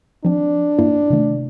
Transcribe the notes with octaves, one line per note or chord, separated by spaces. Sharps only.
F3 C4 D4
G2 A#3 E4
C3 D#3 A3